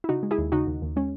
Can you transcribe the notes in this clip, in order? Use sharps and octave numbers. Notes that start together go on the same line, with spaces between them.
E4
C#3 D#4 F#4
G#3
E4 G#4
D#2
C#3 D#4 F#4
D#2
D#2
G#3 C#4